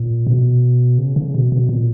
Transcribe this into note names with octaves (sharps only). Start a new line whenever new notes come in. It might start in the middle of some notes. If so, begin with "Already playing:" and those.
Already playing: A#2
B2
C#3
C#3
B2
B2
A#2